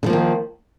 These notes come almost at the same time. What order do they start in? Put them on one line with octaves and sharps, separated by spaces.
D3 F3 A#3 D#3